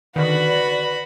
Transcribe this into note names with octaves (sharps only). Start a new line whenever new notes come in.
D3 D#3 F#4 B4 D5 B5